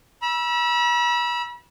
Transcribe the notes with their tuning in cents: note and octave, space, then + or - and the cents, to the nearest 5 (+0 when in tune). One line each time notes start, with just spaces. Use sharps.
B5 -40 E6 +5